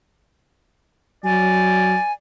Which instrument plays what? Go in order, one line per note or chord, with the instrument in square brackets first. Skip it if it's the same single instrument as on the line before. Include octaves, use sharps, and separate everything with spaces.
[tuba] F#3 [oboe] D5 [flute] G#5